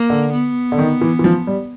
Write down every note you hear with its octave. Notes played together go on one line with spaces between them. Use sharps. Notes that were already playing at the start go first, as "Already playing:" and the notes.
Already playing: A#3
D3
B3
D3
D#3
E3
E3
F3
G3